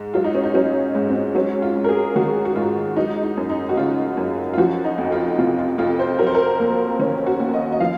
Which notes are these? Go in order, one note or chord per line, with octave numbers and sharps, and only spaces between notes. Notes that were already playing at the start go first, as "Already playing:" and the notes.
Already playing: G#2
F#3 F4
D#4
C#4
D#4
F#3 C#4
G#2
C4
F#3 C#4
F4
G#2
A#4
G#4
D#3 F#4
F#4
G#2 F4
F#3 D#4
D#4
F#2
D#4
F#4
C#3 F4
F#2
F4
F3 F#4
D#4
F2
F4
C3 F4
F4
F2 F4
C5
F#3 A#4
C5
A#4
D#2
D#3 C#4
F#4
D#2
D#5
D#5
F3 F5